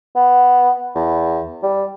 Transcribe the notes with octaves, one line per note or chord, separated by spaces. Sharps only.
B3
E2
G3